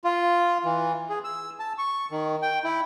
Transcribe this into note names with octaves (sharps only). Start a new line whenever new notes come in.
F4
E3
G#4
E6
A5
C#6
D#3
G5
E4